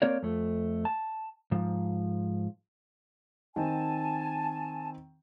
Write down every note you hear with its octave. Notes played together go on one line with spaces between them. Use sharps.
A#3 C4 A#4 C#5 D5
F2 A3
A5
G#2 F3
D#3 C4 G#5 A5